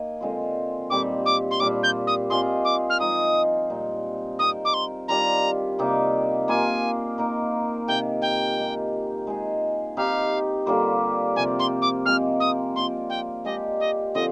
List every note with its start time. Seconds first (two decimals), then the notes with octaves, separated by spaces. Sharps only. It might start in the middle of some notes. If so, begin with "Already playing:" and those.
Already playing: A#3 D#4 G#4 D#5
0.21 D3 G#3 C4 F4
0.90 A#2 G3 C4 D#4 D6
1.26 D6
1.51 C6
1.60 A#2 G3 D4 F4 D6
1.83 G6
2.07 D#6
2.30 C4 F4 G#4 D#5 C6
2.65 D6
2.90 F6
3.00 F3 G#3 D#4 D#6
3.70 A#2 G3 C4 D#4
4.39 C4 D#4 A#4 D#6
4.65 D6
4.74 C6
5.08 D#3 G3 D4 F4 A#5
5.79 C3 G3 A#3 D#4
6.48 A#3 F4 G#4 G#5
7.18 A#3 D#4 A#4
7.88 C3 D#3 A#3 G5
8.22 G5
8.57 G#3 D#4 G4
9.27 G#3 D#4 G#4
9.97 C4 D#4 G4 F5
10.66 D3 G3 A#3 F4
11.36 C3 F3 C4 G#5
11.59 C6
11.82 D6
12.06 G#3 C4 F4 A#4 F6
12.40 D#6
12.75 A#3 D4 F4 C6
13.10 G5
13.45 G#3 D4 G4 D#5
13.80 D#5
14.14 D3 F3 C4 F4 D#5